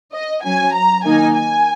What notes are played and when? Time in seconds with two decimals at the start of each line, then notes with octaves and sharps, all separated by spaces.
0.14 D#5
0.44 F#3 C#4 G#5
0.75 A#5
1.05 D#3 A#3 D#4 G#5
1.36 G#5